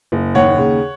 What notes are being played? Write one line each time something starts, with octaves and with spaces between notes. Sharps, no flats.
F#1
D#2 C#5 F#5
C#3